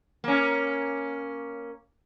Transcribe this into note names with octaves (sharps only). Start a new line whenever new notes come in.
A#3 C#4